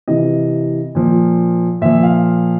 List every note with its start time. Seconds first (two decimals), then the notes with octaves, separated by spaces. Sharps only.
0.08 C3 E3 D#5
0.95 A#2 F3
1.81 A#2 F3 E5
2.03 F5